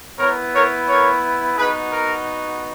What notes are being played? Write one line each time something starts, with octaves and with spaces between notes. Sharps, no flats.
B3 E4 A#4 C#5
A#4 C#5
A#4 C#5
B3 D#4 F#4 G#4 B4
A#4